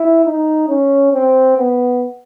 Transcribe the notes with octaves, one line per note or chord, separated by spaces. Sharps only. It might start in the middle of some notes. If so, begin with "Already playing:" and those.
Already playing: E4
D#4
C#4
C4
B3